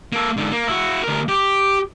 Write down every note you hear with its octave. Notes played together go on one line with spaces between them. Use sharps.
A#3 A4
G#2 D3
A#3
E4 F#4
D2 A#4
G4